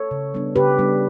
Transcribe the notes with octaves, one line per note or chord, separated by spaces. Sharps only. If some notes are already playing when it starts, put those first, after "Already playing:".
Already playing: A4 C#5
C#3
G3 B3 D4
C#3 G4 B4
G3 B3 D4